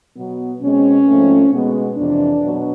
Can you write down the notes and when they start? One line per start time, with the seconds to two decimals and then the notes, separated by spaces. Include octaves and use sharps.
0.16 B2 F#3 B3
0.61 B2 G#3 C4 C#4
1.06 G#2 F3 A3 C4
1.51 B2 G#3 B3
1.97 F2 C3 E3 D4
2.42 B2 F#3